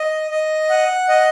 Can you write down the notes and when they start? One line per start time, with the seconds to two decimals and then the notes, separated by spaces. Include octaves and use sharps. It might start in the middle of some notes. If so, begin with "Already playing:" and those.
Already playing: D#5
0.30 D#5
0.70 F#5
1.09 D#5